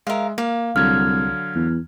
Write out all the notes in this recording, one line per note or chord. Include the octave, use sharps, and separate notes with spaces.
G#3 A#4 E5 F5
A#3 F5
C2 D3 F#3 F6 G#6
E2